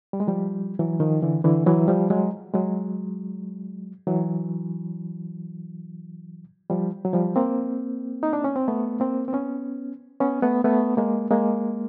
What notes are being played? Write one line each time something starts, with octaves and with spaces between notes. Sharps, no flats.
G3
G#3
F3 G3
E3 F#3
D#3 F3
D3 E3
D3 E3
E3 F#3
F3 G3
F#3 G#3
F#3 G#3
E3 F#3
F3 G3
F#3
F3 G3
A#3 C4
D#4
D4
C#4
C4
A3 B3
A#3 C4
C4
B3 C#4
B3 C#4
A3 B3
A3 B3
G#3 A#3
G#3 A#3